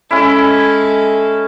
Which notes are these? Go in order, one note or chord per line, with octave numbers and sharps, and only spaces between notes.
G#3 C#4 E4 A4